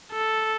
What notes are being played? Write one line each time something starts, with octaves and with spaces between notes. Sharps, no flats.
A4